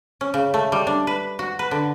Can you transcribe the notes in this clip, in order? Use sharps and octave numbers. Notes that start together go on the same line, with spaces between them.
C#4
C#3
A3
G3
D4
B4
F#4
B4
D3